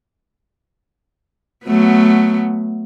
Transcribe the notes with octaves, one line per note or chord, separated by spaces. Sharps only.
F#3 A3 B3